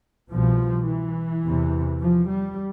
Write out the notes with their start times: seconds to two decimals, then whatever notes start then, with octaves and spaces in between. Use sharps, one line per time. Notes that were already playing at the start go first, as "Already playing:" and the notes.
0.31 C2 B2 F3
0.87 E3
1.44 E2 C3
2.00 F3
2.28 G3